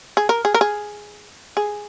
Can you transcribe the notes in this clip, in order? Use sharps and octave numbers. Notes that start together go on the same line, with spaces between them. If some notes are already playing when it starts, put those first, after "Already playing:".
G#4
A#4
G#4
A#4
G#4
G#4